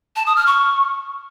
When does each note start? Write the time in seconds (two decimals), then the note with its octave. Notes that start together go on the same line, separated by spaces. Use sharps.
0.16 A5
0.26 D#6
0.36 F6
0.46 C#6